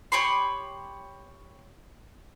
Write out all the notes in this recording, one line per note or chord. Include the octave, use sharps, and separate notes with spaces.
G4 C#5 B5 C6